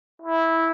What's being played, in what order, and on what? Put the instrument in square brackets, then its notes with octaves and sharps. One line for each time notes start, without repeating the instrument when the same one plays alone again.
[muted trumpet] E4